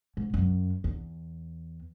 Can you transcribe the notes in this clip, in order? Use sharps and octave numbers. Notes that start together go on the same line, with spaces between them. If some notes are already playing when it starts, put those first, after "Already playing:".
G#2
F#2
E2